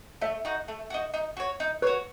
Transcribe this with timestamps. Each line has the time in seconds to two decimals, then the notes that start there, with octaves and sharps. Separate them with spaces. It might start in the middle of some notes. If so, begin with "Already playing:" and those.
0.22 A3 E5
0.45 D#4 F#4
0.68 A3
0.90 D#4 F#4
1.14 D#4
1.37 F#4 C#5
1.60 D#4
1.82 F#4 B4 C#5